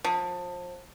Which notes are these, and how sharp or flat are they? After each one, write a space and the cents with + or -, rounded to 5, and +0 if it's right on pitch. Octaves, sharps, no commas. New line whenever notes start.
F3 +30